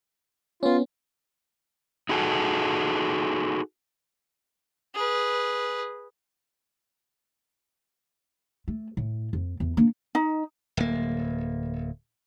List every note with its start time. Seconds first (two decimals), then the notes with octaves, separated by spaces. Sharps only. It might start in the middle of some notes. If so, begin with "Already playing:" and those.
0.63 B3 C#4 F4
2.09 D#4 F#4 G#4 A4
4.95 G#4 B4
8.68 A3
8.97 A2
9.33 F2
9.60 E2
9.77 A#3 D4
10.15 D#4
10.77 D1 A#3